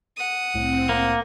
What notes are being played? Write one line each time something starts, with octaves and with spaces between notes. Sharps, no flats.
F#5 D#6
C2 A2 C4
A#3